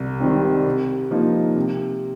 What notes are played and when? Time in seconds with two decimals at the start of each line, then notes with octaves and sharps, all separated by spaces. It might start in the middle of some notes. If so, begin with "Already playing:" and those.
Already playing: C2
0.20 C3 D#3 G3 C4
0.66 C3
1.11 F3 A#3 D#4
1.56 C3